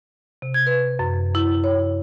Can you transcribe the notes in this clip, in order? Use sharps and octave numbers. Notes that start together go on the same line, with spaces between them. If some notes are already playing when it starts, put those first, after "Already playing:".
C3
G#6
B4
F#2
E4
C#5